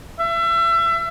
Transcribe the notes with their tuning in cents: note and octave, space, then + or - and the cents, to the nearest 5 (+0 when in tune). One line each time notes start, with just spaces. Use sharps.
E5 +30